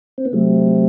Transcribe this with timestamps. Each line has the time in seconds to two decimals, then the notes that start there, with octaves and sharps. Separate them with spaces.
0.18 C4
0.25 B3
0.33 C3 F#3 A3